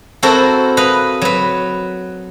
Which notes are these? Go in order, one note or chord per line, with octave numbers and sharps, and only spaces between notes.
C4 E4 F#4 A4 A#4 C5
B4 D#5 F5
F#3 B4